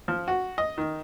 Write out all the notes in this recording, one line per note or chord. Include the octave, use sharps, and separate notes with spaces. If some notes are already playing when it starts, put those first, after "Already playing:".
F3
F#4
D#5
D#3